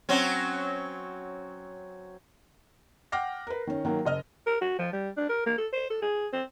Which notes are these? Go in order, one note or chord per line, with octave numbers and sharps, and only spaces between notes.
F#3 C4 C#4
F#5 G5 D6 F6 A#6 C7
A#4 B4
D#3 C#4
D#3 F#3 A#3
F#1 D#5 F6
A#4
F#4
F3
G3
D4
A#4
A#3
A4
C5
A4
G#4
C4